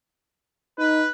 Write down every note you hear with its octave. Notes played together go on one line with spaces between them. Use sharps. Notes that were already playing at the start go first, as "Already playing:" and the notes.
D#4 B4